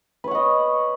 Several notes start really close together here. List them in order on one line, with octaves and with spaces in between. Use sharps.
B4 C#5 F#5 D#5